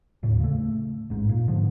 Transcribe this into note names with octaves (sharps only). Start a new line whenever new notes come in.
D#1 D2 A2
C#3 A3
A1 G#2
A#2
G#2 D3 F3